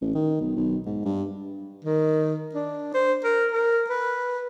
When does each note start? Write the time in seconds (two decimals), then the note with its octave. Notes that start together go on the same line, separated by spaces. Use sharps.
0.01 A1
0.15 D#3
0.41 B1
0.56 B1
0.86 G#2
1.05 G2
1.84 D#3
2.54 D4
2.94 C5
3.24 A#4
3.52 A#4
3.89 B4